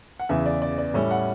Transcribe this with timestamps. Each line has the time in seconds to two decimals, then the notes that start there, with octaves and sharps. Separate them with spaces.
0.20 F#5
0.29 E2 C#3 E3 E5
0.46 D5
0.62 D5
0.78 D5
0.94 A2 G3 C#4 E5
1.11 F#5